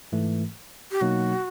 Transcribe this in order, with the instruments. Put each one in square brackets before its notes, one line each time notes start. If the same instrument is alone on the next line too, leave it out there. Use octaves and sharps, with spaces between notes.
[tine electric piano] G#2 E3 A3
[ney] G4
[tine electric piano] B2 F#3 A#3 D#4 [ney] F#4